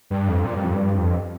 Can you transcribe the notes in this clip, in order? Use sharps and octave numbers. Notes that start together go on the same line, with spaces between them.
G2
F2
A#2
G2
F2
G2
F2